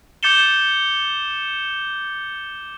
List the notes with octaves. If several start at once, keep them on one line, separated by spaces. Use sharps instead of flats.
D6 G6 A6 C#7 E7 G7